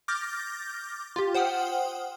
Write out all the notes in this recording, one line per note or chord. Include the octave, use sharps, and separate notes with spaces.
D6 F6 G6 A6 A#6
F4 G4
C5 F#5 G5 D#6 F6